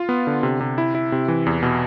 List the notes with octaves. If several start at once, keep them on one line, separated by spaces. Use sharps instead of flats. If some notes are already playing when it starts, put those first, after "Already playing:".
Already playing: F4
B3
D3
C3
C3
E4
E4
C3
E3
E2
B2